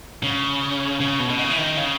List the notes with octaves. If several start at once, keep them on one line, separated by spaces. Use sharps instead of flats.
C#3
C#3
B2
B2
C#3
E3
D#3
C#3